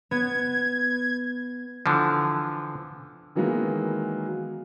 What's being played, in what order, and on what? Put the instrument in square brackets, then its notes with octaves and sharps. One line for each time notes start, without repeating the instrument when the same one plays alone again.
[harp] B3 [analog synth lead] G#6
[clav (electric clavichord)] D3 E3 F3
[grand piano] D#3 E3 F#3 G#3 A#3 B3